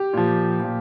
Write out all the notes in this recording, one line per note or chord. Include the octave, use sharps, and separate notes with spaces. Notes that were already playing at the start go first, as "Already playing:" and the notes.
Already playing: G4
A#2 F3
A#2 F3